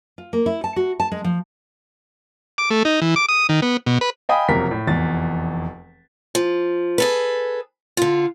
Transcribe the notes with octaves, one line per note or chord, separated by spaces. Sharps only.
F4
A#3
E4
A5
F#4
A5
G#3
F3
D6
A3
D#4
E3
D6
D#6
D#3
B3
B2
B4
D#5 F5 G5 G#5 B5 D#6
F#1 F2 C3 A#4 B6
A2
F1 E2 A6
F3
G#4 A4 B4
D3 F4